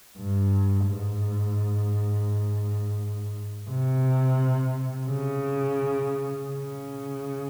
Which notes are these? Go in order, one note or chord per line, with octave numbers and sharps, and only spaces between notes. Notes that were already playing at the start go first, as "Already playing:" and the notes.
G2
G#2
C3
C#3
C#3